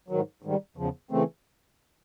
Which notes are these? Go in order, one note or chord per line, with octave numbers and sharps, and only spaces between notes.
G#2 D#3 F#3
G#2 D#3 G3
E2 C#3 F3
C#3 E3 A3 C4